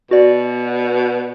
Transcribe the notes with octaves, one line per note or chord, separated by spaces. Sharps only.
B2 F#4 D5